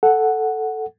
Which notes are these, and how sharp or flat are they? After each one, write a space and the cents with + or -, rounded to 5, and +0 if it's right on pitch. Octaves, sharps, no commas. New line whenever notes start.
A4 +0 F#5 +0